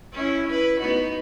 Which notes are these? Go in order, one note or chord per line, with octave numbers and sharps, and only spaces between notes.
C#4 E4
E4 B4
B3 D#4 F#4